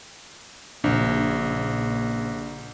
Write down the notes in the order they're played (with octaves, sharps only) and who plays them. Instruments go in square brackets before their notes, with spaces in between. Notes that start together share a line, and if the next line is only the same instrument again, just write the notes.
[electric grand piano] A#1 [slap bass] A#2 C#3 D4